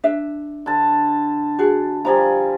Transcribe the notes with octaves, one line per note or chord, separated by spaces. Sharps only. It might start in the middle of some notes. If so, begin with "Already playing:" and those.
D4 E5
D3 A5
F#4 G#4
F3 G3 G#4 A#5